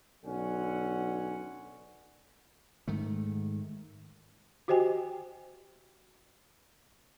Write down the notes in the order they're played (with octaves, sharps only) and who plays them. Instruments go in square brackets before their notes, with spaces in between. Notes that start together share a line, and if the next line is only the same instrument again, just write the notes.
[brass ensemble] B1 D3 C#4 F#5
[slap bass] G#2 D#3 A3
[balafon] F#4 G4 C5 D#5 G5 G#5